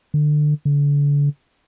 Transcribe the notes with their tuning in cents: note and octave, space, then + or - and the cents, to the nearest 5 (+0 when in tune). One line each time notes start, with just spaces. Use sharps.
D3 +25
D3 -35